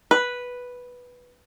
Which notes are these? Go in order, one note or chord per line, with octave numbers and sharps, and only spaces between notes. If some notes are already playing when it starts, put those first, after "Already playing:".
B4